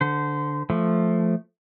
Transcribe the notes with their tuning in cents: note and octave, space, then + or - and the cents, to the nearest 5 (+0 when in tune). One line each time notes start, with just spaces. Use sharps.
D3 +0 C5 -20
F3 +0 A3 +0